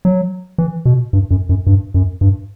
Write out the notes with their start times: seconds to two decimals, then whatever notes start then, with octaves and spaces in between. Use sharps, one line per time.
0.05 F#3
0.58 E3
0.85 B2
1.13 G2
1.31 F#2
1.49 F#2
1.67 G2
1.94 F#2
2.21 G2